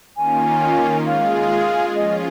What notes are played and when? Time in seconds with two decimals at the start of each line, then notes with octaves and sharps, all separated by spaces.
0.16 D#3 A#3 C#4 F4 G#5
1.06 G#3 F4 G#4 F5
1.95 F3 C#4 F4 G#4 D#5